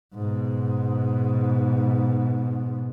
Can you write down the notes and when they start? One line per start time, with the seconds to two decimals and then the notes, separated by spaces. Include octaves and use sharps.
0.14 G#2 B2